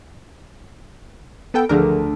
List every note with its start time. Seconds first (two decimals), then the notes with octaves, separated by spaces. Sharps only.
1.54 B3 A4 G5
1.69 D2 D3 F3 A3 D4 A#4